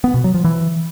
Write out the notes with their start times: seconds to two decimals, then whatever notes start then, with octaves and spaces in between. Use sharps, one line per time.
0.04 B3
0.14 B2
0.24 F#3
0.34 F3
0.44 E3